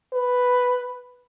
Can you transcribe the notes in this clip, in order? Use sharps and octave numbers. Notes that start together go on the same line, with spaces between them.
B4